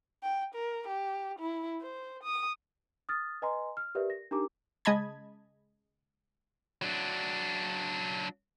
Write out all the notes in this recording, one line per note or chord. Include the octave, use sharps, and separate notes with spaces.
G5
A#4
G4
E4
C5
D#6
D#6 F6 A6
B4 D#5 G#5 A#5 C6
F6
G4 A#4 B4 D5 E5
A#6
D4 D#4 G4 A#4 A#5 D6
C#3 G#3 D#5 A5 B5 G#6
F#3 D4